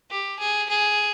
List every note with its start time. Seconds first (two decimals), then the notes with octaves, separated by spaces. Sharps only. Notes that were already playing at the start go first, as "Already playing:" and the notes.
0.11 G4
0.39 G#4
0.69 G#4